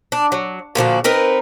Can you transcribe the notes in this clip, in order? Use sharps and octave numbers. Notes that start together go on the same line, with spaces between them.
D4
F#3
A#2 D3 F3 F#4
C4 D#4 A#4 B4